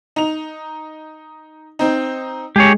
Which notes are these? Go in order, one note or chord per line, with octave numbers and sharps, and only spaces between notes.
D#4 F7
C4 D#4
G#3 G4 G#4 C#5